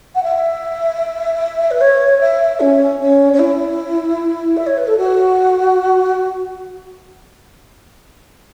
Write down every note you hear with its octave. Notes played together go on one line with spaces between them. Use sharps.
F#5
E5
B4
C#5
E5
C#4
C#4
C#4
E4
E5
C#5
B4
A4
F#4